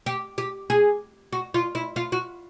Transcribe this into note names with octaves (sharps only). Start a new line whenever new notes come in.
G4
G4
G#4
F#4
F4
E4
F4
F#4